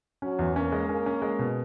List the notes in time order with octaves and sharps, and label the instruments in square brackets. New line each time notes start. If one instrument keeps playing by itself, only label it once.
[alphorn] F#3 [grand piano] C#4
[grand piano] E2
[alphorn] A#3 [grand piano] C#4
[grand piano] G#3
[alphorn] A#3 [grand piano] C#4
[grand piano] C#4
G#3
B2